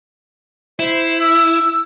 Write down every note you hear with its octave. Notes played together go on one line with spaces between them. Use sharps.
E4 C5
E6